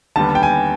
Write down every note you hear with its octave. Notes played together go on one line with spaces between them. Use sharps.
D#2 D3 G3 B3 A5
G5
G#5